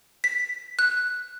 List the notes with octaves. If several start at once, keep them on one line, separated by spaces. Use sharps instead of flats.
B6
F#6